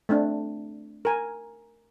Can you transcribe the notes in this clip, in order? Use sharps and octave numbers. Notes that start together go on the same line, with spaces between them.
A3 C4 D4
A#4 G#5